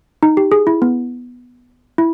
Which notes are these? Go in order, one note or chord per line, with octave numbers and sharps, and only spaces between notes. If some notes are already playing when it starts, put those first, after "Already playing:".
D#4
G4
G#4
E4
B3
E4